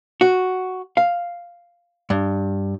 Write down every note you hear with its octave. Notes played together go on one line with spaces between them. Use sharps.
F#4
F5
G2